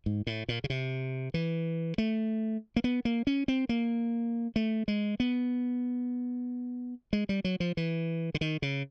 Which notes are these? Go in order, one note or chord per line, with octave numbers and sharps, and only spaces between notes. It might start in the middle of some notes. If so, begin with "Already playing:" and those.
G#2
A2
A#2
C#3
C3
E3
A3
A#3
B3
A#3
C#4
C4
A#3
A3
G#3
B3
G#3
G3
F#3
F3
E3
D3
D#3
C#3